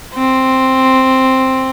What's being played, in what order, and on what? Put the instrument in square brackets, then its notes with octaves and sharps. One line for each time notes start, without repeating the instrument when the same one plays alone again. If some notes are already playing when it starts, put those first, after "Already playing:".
[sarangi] C4